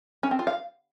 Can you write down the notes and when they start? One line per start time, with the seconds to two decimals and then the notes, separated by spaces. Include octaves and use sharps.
0.23 C#4
0.31 C4
0.39 F4
0.47 F5